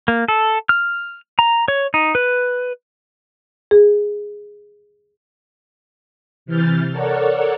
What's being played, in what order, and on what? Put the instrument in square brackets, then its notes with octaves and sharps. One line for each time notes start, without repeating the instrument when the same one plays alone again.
[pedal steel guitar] A#3
A4
F6
A#5
C#5
D#4
B4
[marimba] G#4
[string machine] C3 E3 F6 G6 A6
A4 A#4 C#5 D5 F#5